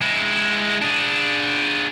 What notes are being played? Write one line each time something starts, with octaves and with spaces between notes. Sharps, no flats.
G#3 E4
D4 G#4